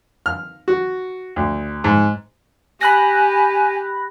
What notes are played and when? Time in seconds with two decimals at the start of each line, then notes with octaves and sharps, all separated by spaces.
0.26 F6
0.68 F#4
1.36 D2
1.84 G#2
2.81 G4 G#5 B5 F#6 A#6